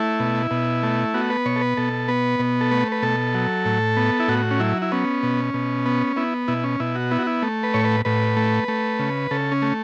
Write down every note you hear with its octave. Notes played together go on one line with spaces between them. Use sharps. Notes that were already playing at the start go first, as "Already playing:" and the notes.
Already playing: A3 E4
B2
B2
A3
B3 F#4
B4
B2 C#5
A4
B4
B2 A4
B3 B4
B2
A4
A3 B4
B4
B2 A4
F#3
A2
B3
E4
A2 F#4
C#4
F#3 E4
E4
B3 C#4
B2
B2
B3
B3 E4
B2 E4
C#4
B2 E4
F#4
B3 E4
F#4
E4
A3
B4
A2 C#5
B4
A2 B4
A3
A3
C#3
C#3 A4
C#4
A3